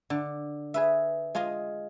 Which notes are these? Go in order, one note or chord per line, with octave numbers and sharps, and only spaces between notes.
D3
G#4 B4 E5
G#3 F4 G#4 D#5